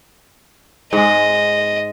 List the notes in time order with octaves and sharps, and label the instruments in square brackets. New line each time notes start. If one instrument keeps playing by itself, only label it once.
[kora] G#2 G#3 [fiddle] D#5